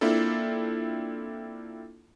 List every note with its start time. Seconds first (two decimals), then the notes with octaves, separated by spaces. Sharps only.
0.01 A#3 C4 D4 E4 F4 A4